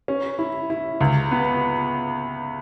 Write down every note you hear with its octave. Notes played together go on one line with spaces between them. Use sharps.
C#4
E4
E4
C#2
B3